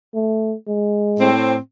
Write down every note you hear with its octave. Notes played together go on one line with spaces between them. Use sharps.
A3
G#3
A2 C4